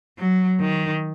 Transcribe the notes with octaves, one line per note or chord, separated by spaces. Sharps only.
F#3
D#3